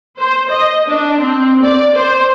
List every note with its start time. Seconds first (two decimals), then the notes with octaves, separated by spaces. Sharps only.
0.18 C5
0.50 D#5
0.89 D4
1.19 C4
1.63 D5
1.94 C5